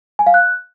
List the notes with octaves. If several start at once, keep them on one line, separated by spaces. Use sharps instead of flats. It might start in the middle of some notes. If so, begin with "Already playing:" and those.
G#5
F5
F#6